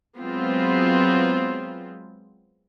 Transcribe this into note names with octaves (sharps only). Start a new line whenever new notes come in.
F#3 G#3 B3 C4 F4